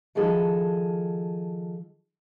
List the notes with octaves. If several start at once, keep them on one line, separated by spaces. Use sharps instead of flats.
D#3 F3 F#4 G#4 A4